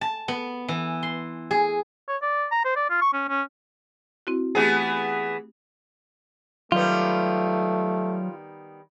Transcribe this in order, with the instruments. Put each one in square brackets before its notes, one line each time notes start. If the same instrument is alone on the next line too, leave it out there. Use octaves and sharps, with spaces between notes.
[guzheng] A5
B3
E3
C6
G#4
[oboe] C#5
D5
A#5
C5
D5
F4
C#6
C#4
C#4
[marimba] C4 E4 F#4
[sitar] E3 B3 G#4 [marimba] A3 G4
[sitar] D#3 G3 B3 [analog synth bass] F#3 [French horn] A3 [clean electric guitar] F4